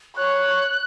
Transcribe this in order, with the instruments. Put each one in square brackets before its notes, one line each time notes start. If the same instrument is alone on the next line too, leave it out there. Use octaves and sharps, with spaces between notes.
[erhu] C#5 [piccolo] F#6